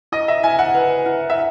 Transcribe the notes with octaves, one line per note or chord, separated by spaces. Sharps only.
E4 D#5
E5
E4 G#5
F#5
B4
E4
E5